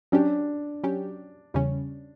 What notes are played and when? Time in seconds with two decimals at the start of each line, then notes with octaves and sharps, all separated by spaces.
0.12 F#3 C#4 D4 G4
0.84 F#3 C#4 G4
1.54 E2 C#3 G3 C#4